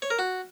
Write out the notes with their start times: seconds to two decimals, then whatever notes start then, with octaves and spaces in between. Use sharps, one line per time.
0.02 C#5
0.10 A#4
0.19 F#4